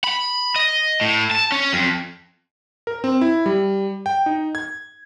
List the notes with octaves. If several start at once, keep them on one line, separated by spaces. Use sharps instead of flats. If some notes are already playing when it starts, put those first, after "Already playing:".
B5
D#5
A2
A5
C#4
F2
A#4
C4
E4
G3
G5
D#4
G#6